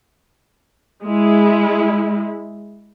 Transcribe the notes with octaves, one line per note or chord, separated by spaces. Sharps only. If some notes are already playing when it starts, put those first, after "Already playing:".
G#3 E4